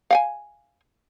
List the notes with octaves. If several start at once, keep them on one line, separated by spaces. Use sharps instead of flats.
F5 G5 G#5